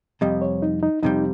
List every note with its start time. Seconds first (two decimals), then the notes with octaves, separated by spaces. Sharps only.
0.21 F2 C3 G3 D#5
0.41 C#5
0.62 D#4
0.83 D#4
1.02 F2 C3 G3 D#4